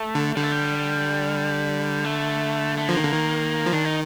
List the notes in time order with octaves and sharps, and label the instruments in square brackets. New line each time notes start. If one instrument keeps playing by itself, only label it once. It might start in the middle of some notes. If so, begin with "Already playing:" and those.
Already playing: [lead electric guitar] A3
[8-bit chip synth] D3
[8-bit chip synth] D3 [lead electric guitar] G3
[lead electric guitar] A3
G3
A3
A3
[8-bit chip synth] F3 [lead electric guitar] A#3
[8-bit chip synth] D#3
D3
D#3
F3
[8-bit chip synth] D#3 [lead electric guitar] D4
[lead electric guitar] D#4